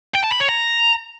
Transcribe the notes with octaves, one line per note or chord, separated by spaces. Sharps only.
G5
A5
B5
C#5
A#5